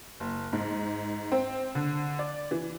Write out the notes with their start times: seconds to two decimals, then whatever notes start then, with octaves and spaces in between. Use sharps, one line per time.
0.20 F#1
0.53 G#2
1.32 C4
1.75 D3
2.19 D5
2.51 E3